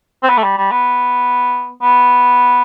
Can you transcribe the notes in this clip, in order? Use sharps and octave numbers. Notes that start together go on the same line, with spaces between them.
C4
B3
A3
G3
G3
B3
B3